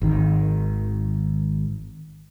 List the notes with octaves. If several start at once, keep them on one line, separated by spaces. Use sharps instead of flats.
G#1 D#3